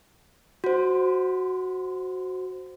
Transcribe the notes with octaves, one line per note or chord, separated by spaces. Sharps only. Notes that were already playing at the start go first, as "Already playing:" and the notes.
F#4 C5